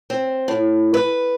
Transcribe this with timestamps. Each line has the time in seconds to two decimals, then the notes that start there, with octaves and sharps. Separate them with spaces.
0.10 C4
0.48 A2
0.94 B4